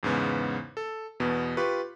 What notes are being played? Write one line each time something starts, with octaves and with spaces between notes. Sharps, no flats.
E2 G#2 C#3 B3
A4
E2 B2 B3
F4 G4 B4 C#6